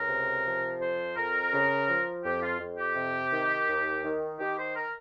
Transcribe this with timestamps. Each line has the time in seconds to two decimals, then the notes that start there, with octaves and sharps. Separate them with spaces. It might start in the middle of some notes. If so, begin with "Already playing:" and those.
Already playing: C#2 A#4
0.09 C3
0.45 F3
0.80 F2 C5
1.16 F2 A#4
1.53 C#3
1.88 F3
2.24 F2 G4
2.42 F4
2.60 F2
2.78 G4
2.96 C3
3.33 D#3
3.68 D#2
4.04 D#3
4.40 D#3 G4
4.58 C5
4.76 A#4